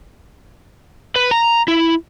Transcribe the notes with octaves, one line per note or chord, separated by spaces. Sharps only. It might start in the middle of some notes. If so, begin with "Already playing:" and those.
B4
A#5
E4